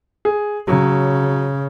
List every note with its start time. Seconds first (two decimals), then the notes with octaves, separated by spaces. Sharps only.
0.25 G#4
0.68 C#3 F#3